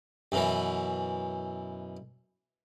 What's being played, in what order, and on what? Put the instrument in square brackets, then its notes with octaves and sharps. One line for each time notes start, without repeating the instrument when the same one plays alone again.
[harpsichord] F#2 B2 E3